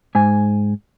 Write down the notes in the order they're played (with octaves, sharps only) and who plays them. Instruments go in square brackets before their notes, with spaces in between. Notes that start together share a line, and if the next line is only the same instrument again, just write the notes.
[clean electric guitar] G#2 G#5